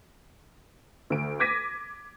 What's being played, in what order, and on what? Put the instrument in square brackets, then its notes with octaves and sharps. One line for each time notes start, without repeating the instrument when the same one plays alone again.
[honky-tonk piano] D2 D7
D6 G#6 A#6 B6 D#7